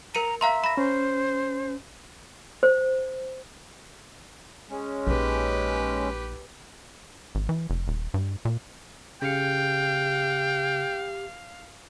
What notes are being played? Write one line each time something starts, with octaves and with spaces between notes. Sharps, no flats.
A#4 A#5 C#7 D#7
E5 F5 A#5 C6
B5 A#6
C#4 C5
C5
G#3 C#4
A#1 D#4 G4 B4
G#1
E3
F1
D#1
G2
A#2
C#3 G4 F5 G5 C#7